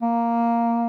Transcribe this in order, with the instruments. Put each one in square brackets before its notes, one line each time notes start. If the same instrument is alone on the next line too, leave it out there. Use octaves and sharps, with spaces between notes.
[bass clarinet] A#3